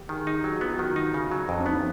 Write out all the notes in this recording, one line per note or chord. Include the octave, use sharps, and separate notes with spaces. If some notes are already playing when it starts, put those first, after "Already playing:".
Already playing: G4
D#3 G#4
D#4
F#3 G4
F#4
B3 F4
F#4
D#3
D#4
C#3
F#3
F2 C#4
D4
B3 D#4
E4